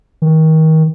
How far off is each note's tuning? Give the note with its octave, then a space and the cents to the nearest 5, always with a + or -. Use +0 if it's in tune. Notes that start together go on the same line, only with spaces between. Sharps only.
D#3 +30